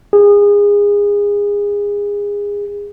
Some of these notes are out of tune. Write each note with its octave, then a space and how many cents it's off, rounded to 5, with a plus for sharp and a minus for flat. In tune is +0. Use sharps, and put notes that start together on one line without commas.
G#4 -25